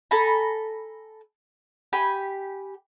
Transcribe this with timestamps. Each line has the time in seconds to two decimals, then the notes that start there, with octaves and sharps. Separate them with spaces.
0.11 A4 G#5 A#5 B5
1.93 G4 G#5 B5